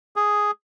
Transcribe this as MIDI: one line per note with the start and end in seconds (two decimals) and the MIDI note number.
0.16 0.51 68